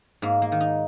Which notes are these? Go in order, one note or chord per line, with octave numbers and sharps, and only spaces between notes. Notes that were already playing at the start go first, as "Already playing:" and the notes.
G#2 A#3
A#3
D#3
D#4